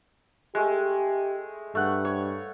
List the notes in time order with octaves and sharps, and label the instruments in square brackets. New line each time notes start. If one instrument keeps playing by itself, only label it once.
[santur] G#3 A3 [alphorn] G4
[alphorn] G2 [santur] A3 F#5
[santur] C#5